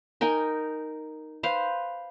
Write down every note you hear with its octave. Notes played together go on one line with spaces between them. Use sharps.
D#4 A#4 G5 G#5
B4 C5 F5